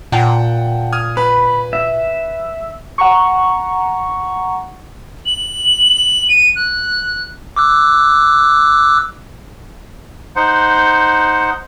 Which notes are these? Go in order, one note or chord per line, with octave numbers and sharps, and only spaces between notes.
A#2 F#5 G5 A5
D#6 F6 G#6
B4 B5
E5
F#5 A#5 C#6
F#7
D#7
F#6
D6 E6 F#6
D#4 C5 F#5